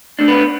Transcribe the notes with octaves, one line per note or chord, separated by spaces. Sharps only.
A3 D4
B3 B4